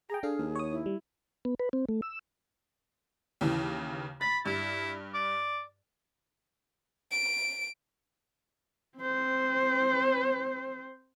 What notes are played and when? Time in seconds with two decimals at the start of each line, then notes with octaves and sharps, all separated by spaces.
0.10 G#4 G5 A#5
0.23 D4 G#4 A4 F5
0.38 D#2
0.55 C#5 D#6
0.71 E4
0.86 G3
1.45 B3
1.60 B4
1.73 C4
1.89 A3
2.02 E6
3.41 D#2 C#3 E3
4.21 B5 A6
4.46 G2 E4
5.14 D5
7.11 D7
8.97 C4 C5